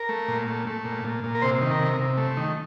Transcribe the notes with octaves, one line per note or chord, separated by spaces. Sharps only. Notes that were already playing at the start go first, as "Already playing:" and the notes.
Already playing: A#4
A3
A#2
A3
A3
A#2
A#2
A#2
A#4
C3 C5
D#3
A#4
C3
C3
A3
D#3